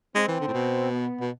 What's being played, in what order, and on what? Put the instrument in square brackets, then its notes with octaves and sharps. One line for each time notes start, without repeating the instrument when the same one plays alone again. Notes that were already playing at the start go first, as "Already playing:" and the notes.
[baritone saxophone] G#3 [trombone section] C4
[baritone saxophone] E3
D3
A2
B2
[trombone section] B3
[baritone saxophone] B2